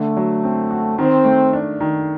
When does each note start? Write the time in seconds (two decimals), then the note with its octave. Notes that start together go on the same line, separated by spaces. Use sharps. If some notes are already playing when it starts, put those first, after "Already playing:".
Already playing: D3 A3
0.17 F#3
0.44 C4
0.71 F#4
0.98 D#3 C4
1.25 A3
1.53 D4
1.80 D#3